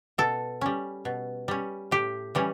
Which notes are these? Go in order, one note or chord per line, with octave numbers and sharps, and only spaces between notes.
B2 A4
G3 C#4
B2
G3 C#4
A2 G4
E3 G3 C#4